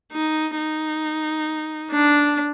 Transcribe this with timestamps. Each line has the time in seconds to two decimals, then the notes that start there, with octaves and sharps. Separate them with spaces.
0.12 D#4
0.57 D#4
1.92 D4